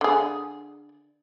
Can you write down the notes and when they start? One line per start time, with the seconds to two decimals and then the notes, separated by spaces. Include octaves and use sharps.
0.01 D3 G#4